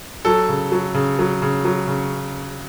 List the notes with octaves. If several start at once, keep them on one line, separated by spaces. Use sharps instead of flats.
F#3 A4
C#3
F#3
C#3
F#3
C#3
F#3
C#3